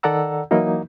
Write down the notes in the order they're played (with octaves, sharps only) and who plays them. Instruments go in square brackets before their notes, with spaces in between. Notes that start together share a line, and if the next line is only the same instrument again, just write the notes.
[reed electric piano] D#3 A4 D5 F#5 A#5 E6
E3 F#3 A#3 D#4 E4